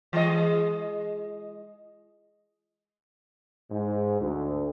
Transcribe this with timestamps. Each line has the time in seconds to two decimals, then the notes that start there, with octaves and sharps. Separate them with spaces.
0.13 E3 G#3 D#5
3.70 G#2
4.20 D2